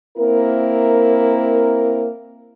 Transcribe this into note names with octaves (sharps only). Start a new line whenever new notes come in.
A#3 C4 E4 A#4